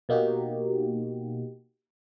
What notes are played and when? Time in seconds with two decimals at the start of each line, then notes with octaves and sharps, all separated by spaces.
0.09 B2 A#3 D#4 F#4 G4